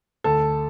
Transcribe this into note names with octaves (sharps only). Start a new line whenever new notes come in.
D2 A4